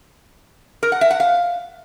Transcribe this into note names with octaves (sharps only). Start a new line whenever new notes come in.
A#4
F#5
E5
F#5
F5